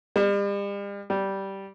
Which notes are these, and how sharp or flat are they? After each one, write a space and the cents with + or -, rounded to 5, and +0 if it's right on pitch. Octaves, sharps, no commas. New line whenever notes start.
G3 +40
G3 -10